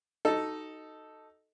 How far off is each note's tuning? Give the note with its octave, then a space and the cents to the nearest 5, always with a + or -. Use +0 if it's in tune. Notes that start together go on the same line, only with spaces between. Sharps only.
D#4 +0 F#4 +35 A4 +0